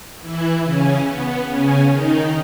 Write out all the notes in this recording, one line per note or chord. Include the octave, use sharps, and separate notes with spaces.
E3 E4
C#3 C#4
B3
C#3 C#4
D#3 D#4